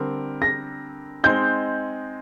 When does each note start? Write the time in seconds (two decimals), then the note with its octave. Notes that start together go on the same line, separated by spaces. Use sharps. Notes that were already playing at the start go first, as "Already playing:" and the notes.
Already playing: D3 G3 C4 A#4
0.42 A#6
1.24 G#3 C4 D#4 G6